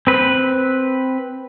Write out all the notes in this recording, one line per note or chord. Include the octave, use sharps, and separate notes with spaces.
C4 B4